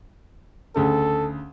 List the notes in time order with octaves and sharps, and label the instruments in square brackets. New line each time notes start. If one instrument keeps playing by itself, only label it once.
[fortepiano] D2 C#3 [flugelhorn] A4